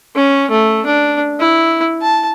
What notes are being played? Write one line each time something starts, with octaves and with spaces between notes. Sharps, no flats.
C#4
A3
D4
E4
A5